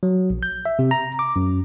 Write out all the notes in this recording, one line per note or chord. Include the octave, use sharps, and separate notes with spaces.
F#3
A#1
G6
E5
C3
A#5
D6
F#2